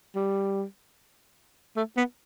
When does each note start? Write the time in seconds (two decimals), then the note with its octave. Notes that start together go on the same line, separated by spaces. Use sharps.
0.16 G3
1.76 A3
1.97 B3